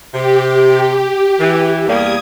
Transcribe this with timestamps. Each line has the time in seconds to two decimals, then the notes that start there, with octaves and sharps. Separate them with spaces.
0.14 C3 G4
1.39 E3
1.88 E2 G3 A#3 D#6 G#6